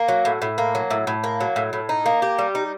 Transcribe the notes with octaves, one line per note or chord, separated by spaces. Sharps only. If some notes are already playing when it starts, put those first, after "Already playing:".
Already playing: A#3
F#3
A2
A2
A#3
F#3
A2
A2
A#3
F#3
A2
A2
D#4
A#3
G4
G3
D#4